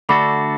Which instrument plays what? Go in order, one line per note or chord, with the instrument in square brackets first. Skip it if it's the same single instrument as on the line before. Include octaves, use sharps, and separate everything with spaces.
[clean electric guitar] D3 A3 D4 F#4 A4 [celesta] B5 D6